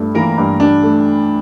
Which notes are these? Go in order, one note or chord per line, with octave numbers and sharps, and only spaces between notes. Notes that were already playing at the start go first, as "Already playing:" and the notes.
Already playing: G2 A3
E3 A#3 A#4
G2
G2 D4
A3